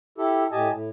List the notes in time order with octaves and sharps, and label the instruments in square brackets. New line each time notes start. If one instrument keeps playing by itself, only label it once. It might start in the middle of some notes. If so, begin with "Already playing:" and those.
[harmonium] E4 G4 A4
A2 G4 D#5 G#5 A5
A2